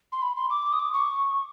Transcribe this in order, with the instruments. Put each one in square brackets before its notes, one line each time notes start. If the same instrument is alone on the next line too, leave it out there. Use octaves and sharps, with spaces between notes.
[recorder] C6
B5
C6
D6
D#6
D6
C#6